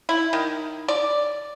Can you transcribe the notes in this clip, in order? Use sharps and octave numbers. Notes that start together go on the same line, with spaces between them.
E4
D#3
D5